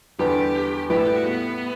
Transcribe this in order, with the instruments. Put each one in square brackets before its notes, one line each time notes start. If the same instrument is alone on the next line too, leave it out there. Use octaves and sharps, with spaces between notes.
[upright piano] E2 D3 G3 B3 [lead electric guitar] G4
[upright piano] A2 G3 B3 E4 B4 [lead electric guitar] G4
[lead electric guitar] A4
G4
F#4
B3